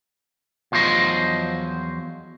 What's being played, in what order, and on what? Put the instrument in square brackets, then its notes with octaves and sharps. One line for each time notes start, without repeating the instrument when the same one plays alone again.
[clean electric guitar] E2 F3 F#3 C5 D#5